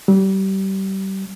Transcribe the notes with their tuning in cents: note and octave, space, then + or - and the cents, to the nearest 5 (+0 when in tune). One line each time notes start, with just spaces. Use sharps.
G3 -25